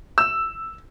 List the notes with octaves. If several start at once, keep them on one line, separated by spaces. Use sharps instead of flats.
E6